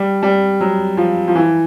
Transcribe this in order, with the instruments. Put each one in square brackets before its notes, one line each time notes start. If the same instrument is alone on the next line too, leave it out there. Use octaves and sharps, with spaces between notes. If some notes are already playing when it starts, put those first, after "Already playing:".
Already playing: [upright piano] G3
G3
F#3
F3
F3
E3